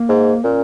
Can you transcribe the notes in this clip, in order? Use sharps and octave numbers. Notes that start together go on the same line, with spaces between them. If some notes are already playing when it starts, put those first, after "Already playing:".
Already playing: A#3
G#2
A#2 C#4